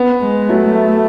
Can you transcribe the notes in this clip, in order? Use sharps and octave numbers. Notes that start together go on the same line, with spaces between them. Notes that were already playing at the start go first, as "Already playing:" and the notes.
Already playing: B3
G#3
F#3 A3